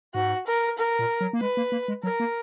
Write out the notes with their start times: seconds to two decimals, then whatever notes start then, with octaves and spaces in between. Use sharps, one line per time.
0.15 G#2 F#4
0.47 A#4
0.78 A#4
0.99 A#2
1.21 F#3
1.33 A#3
1.40 G#3 B4
1.57 A#3
1.72 A#3
1.88 G#3
2.03 F#3 A#4
2.20 A#3